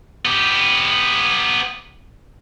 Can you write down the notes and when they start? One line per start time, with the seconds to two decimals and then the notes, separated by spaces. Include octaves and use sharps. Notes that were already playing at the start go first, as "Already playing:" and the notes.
0.25 B3 G4